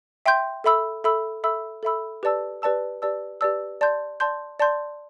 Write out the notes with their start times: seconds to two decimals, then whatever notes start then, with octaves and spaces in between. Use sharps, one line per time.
0.26 E5 G5 C6 G6
0.64 A4 E5 B5 E6
1.04 A4 E5 B5 E6
1.44 A4 E5 B5 E6
1.83 A4 E5 B5 E6
2.23 G4 B4 D5 A5 E6
2.62 G4 B4 D5 A5 E6
3.02 G4 B4 D5 A5 E6
3.41 G4 B4 D5 A5 E6
3.81 D5 A5 C6 G6
4.20 D5 A5 C6 G6
4.60 D5 A5 C6 G6